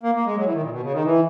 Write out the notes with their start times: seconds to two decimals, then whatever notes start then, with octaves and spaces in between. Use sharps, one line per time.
0.03 A#3
0.15 A#3
0.26 G#3
0.37 F#3
0.45 E3
0.54 D#3
0.62 A#2
0.71 B2
0.82 C#3
0.93 D#3
1.05 E3